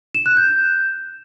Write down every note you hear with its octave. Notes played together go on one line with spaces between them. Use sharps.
E7
F#6
G6